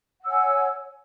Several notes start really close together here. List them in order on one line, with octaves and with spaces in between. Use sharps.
F#5 E6 C#5 G#5